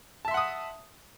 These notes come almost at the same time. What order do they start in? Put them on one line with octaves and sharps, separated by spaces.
A5 E5 C6 F#5 D#6